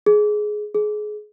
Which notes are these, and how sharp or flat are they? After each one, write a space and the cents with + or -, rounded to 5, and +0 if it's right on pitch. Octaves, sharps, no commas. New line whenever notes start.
G#4 +15
G#4 +25